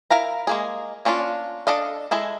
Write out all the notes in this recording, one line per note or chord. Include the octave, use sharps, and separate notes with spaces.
E4 A#4 F5 A#5
G#3 A#3 G#4
A#3 C#4 D4 E4 F4
D4 A4 D#5 F5
G#3 E4 G#4 A4